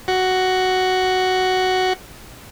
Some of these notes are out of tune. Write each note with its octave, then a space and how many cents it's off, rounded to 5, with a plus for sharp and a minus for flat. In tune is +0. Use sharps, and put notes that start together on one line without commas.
F#4 +5